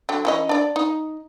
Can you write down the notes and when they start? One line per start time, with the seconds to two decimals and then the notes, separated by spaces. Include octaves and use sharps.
0.09 D3 F#3 G5
0.25 E3 C#4 D#5
0.49 D4 D5
0.76 D#4